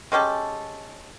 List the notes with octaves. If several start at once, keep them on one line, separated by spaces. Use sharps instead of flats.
G#3 C#4 G4 A4